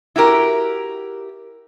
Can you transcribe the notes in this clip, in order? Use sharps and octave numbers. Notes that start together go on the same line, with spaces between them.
E4 F#4 G4 A#4